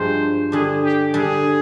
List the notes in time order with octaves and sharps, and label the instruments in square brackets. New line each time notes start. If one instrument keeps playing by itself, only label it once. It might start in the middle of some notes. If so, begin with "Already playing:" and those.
Already playing: [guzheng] G2 F3 G#3 [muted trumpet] C5
[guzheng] D3 G3 D4 [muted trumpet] G#4
[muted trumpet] G4
[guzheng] D3 G3 D4 [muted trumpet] G#4